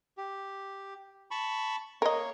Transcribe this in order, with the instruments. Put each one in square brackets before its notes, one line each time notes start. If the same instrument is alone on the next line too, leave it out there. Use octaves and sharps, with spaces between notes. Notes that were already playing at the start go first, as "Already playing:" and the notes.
[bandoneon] G4
A5 B5 C#6
[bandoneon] A#3 C#5 [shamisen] A#4 D#5